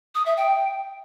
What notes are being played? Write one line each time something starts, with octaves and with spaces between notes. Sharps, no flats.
D#6
E5
G5